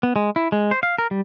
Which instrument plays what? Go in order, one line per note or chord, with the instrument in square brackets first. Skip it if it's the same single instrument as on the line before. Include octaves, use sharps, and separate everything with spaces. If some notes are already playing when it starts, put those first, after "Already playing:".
[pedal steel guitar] B3
G#3
E4
G#3
C5
F5
A#4
G3